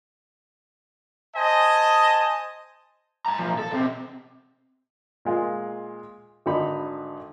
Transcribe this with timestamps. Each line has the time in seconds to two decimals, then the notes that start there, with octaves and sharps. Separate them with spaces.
1.36 C5 D#5 G#5 A5
3.26 G#5 A#5
3.38 B1 F3
3.58 A4
3.71 B2 C4
5.25 A#2 G#3 F4
6.46 G#1 D3 D#4 B5